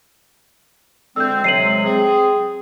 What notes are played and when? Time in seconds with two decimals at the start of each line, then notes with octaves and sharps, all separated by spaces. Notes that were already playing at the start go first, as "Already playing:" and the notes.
1.16 D2 G#3 C4 E6 G6
1.44 C3 F#3 G#3 C7 D#7 F#7
1.84 C4 G#4